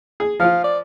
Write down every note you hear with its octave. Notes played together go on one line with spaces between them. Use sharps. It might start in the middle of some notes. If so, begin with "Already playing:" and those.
G#4
F3 F4 F5
D5